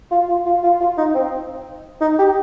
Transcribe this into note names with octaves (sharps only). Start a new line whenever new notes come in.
F4
F4
F4
F4
F4
D#4
C4
D#4
G4